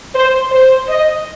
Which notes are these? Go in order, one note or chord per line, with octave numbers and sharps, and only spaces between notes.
C5
C5
D#5